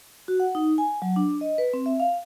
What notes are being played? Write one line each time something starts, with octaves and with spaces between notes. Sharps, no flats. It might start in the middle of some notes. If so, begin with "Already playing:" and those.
F#4
F#5
D#4
G#5
F#3
D4
D#5
B4
C4
E5
F5